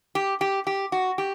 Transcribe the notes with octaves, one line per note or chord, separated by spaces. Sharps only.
G4
G4
G4
F#4
G4